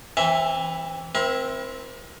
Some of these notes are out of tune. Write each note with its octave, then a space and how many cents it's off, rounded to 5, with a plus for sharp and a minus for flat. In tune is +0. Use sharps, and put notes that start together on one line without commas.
E3 +0 C4 +25 E5 +0
C4 +0 E4 +5 A#4 +35